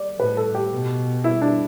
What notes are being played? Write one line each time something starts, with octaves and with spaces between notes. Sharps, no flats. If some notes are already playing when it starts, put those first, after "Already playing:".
Already playing: D5
A2 B4
A4
G4
B2
E4
D4